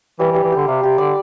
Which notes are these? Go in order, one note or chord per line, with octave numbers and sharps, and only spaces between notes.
E3 G3
E3
G3
E3
D3 G4
C3 F5
C3 G4
D3 D5